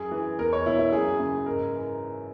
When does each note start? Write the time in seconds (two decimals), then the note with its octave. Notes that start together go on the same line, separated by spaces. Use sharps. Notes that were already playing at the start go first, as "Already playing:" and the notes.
Already playing: F#2 G#4
0.11 E3
0.38 E2 A#4
0.53 C#5
0.66 B2 E4
0.79 E4
0.92 F#2 G#4
1.20 C#3
1.46 G#2 A#4
1.73 E3